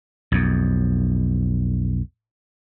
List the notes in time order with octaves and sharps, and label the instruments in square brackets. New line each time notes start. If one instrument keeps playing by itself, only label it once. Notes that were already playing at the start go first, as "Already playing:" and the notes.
[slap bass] B1 F2